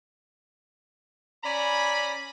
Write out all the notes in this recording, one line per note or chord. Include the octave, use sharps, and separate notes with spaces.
C#4 D5 G#5 A#5 B5